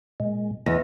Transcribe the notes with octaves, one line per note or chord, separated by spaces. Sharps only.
A#2 G#3
E2 D#5